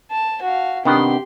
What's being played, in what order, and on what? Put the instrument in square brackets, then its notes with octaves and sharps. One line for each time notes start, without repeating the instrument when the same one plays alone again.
[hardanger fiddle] A5
F#4 F5
[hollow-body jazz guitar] C3 D4 F#5 [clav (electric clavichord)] D#3 B3 [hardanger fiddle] G4 C6